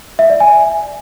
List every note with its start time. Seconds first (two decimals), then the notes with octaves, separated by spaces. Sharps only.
0.19 E5
0.30 D5
0.40 G#5